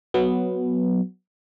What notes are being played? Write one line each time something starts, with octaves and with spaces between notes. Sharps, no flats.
F#3 B3